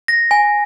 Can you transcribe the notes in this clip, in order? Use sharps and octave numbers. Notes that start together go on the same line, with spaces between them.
A#6
G#5